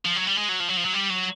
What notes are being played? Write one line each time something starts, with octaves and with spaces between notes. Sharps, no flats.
F3
F#3
G3
G#3
F#3
F3
F#3
F3
F#3
G3
F#3